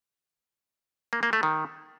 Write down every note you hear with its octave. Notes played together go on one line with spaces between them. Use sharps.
A#3
A#3
A3
D#3